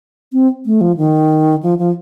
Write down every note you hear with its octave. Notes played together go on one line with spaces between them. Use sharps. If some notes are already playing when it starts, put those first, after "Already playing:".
C4
A3
F3
D#3
F3
F3